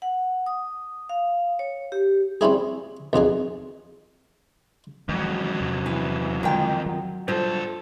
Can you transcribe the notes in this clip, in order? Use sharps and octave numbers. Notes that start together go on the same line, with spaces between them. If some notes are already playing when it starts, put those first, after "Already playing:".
F#5
D#6
F5
C#5
G4
G3 C4 C#4 E4 G#4
B1 F2 D#4 G#4
F2 D#3 E3 F#3 G#3
E2 C3
E3
D3 D#3 G#3 F4 G5
F#3
G2 F4 A4 C5